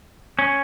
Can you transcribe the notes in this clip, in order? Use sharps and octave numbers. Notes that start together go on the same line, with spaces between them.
C#4